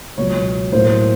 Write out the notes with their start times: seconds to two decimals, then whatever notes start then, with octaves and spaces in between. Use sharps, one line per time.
0.17 C#2 B2 F#3 C#5
0.72 A2 F#3 A#3 C5